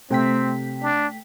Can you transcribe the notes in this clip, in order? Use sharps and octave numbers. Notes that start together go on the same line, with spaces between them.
C3 A3 C4 G5 B6
D4